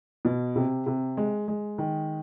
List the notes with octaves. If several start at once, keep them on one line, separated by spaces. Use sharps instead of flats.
B2
C3
C3
G#3
G#3
D#3